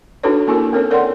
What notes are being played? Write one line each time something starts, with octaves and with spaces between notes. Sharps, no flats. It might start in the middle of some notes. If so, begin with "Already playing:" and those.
D4 D#4 F#4 A4 B4 C#5
A#3 C#4 E4 F#4 G#4 A#4
C4 C#4 A4 A#4 C#5
A#4 C#5 D5 F#5 G5 C6